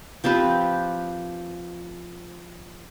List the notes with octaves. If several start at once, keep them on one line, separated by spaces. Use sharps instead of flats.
F3 C4 G4 B4